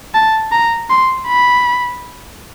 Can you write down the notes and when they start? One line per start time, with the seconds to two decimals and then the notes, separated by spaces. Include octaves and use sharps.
0.15 A5
0.52 A#5
0.90 C6
1.28 B5